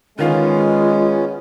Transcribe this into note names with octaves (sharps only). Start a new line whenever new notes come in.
D#3 G#3 B3 C#4 F4 F5